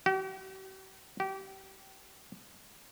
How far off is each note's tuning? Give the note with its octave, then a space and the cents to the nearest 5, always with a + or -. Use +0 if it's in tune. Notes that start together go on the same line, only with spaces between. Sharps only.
G4 -45
G4 -25